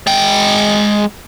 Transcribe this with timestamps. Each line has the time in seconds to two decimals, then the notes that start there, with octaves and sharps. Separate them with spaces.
0.07 G#3 G5